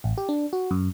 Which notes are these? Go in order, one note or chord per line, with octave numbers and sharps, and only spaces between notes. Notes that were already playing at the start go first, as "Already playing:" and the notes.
A1
G4
D4
F#4
F#2